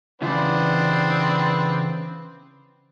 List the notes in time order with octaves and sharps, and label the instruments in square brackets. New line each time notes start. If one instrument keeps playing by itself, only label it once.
[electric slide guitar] C#3 E3 [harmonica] B3 C4 D4